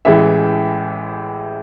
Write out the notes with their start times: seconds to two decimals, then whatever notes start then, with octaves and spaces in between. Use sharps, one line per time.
0.05 A1 A2 E3 G#3 E5